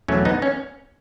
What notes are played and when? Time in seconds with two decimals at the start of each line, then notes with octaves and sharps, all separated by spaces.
0.08 E2 B2 F#3 A3 C#4
0.25 B3 D#4
0.42 C#4